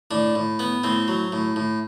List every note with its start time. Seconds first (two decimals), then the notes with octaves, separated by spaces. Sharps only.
0.11 A2 D4
0.35 A2
0.59 B3
0.84 A2 C4
1.08 F#3
1.32 A2
1.56 A2